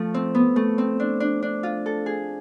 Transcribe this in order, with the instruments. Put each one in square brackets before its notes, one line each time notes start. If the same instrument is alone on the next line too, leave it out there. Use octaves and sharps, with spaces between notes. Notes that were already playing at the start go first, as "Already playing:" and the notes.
Already playing: [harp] F3 A3
C4
B3
A3
C4
D4
D4
D4
F4
A4
G#4